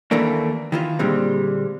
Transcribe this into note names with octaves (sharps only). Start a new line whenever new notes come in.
D#2 E3 A3 A#3 D4
D#3 E3 F4
A#2 D3 G3 G#3 C4